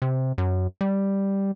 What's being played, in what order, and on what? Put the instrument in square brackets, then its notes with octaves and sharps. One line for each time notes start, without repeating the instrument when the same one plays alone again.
[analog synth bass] C3
F#2
G3